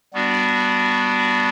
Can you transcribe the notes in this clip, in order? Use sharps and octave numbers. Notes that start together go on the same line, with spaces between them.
G3 B3 D4 F#4